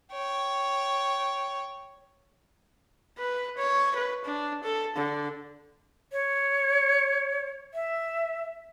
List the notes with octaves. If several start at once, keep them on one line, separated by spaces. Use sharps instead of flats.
C#5 G5
B4
C#5
B4
D4
A4
D3
C#5
E5